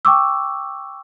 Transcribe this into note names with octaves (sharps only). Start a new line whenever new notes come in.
G5 C#6 D6 E6